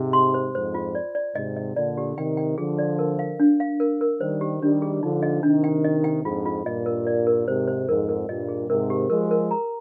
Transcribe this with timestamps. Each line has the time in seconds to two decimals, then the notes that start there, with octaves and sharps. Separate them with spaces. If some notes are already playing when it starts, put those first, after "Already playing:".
Already playing: G#2 C3
0.13 C6
0.34 C5
0.54 F2 G#2 C5
0.74 F4
0.95 D5
1.15 D5
1.35 G#2 C3 D#5
1.57 D#5
1.76 A#2 D3 D5
1.98 G4
2.17 C3 D#3 G5
2.37 G5
2.58 D3 F3 G#4
2.79 D5
2.99 A#4
3.19 F5
3.40 D4
3.60 F5
3.80 A#4
4.01 A#4
4.21 D#3 G3 C5
4.41 G4
4.61 D#3 G3 D4
4.82 G#4
5.02 D3 F3 D#4
5.23 D#5
5.43 C3 D#3 D4
5.64 G5
5.84 D#5
6.04 G5
6.24 F2 G#2 F4
6.46 F4
6.65 G2 A#2 D#5
6.86 A#4
7.07 D5
7.27 A#4
7.47 G#2 C3 C5
7.68 C5
7.87 F2 G#2 A#4
8.09 A#4
8.28 G2 A#2 D#5
8.49 G#4
8.69 G#2 C3 A#4
8.90 G4
9.10 F3 G#3 A#4
9.31 A#4
9.51 A#5